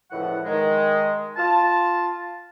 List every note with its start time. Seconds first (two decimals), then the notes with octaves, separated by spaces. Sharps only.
0.11 C#2 A2 E3 F3 F#5
0.45 D#3 G#3
1.37 F4 A5